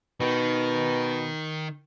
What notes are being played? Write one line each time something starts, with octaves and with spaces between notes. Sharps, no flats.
B2 D#3